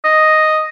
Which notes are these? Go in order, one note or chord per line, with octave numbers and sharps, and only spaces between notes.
D#5